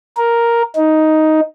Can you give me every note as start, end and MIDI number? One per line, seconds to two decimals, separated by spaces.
0.17 0.62 70
0.76 1.40 63